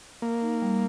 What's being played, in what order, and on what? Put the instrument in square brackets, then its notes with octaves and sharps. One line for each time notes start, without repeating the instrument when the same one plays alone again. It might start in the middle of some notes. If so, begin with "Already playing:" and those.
[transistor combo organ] A#3 [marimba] A#4
[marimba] D#4
G3